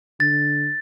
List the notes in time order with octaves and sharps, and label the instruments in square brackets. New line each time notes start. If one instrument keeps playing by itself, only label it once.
[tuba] D3 [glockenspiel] A6